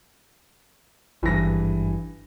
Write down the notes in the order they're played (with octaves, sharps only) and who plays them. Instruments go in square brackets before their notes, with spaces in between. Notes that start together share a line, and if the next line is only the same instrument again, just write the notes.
[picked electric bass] G#1 G2 [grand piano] E3 A#6